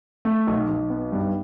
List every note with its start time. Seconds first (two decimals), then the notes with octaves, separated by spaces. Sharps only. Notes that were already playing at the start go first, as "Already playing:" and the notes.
0.25 A3
0.47 B1
0.69 B1
0.90 B3
1.12 G2